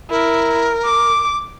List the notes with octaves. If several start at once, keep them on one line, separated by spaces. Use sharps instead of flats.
E4 A#4
D6